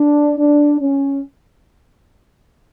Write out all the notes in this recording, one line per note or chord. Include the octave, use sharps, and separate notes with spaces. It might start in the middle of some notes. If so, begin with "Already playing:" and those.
Already playing: D4
D4
C#4